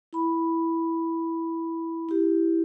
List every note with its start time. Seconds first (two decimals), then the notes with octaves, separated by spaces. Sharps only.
0.13 E4 B5
2.09 E4 G4